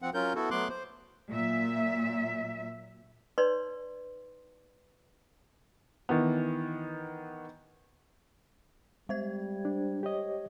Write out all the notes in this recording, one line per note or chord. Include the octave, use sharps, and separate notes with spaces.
F3 C4 F#5
F#3 C#4 F4 A#4 G6
B3 E4 F#4 A4
F#3 A3 B3 C6 D6 F#6
C5
A#2 F#3 E5
D#4 B4 C#5 D5 C6
D#3 E3 B3
G3 G#3 C5 G#6
D4
G4 C#5 D#5